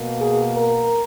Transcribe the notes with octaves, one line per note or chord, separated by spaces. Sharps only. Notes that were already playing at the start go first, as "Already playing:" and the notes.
Already playing: B2 A#3
G#4
A#4